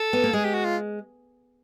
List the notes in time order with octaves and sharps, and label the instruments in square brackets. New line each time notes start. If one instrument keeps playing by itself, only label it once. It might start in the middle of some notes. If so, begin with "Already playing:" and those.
Already playing: [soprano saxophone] A4
[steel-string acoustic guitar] B3
A#3
[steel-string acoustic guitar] G#3 [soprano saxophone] G#4
[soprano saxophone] G4
F#4
F4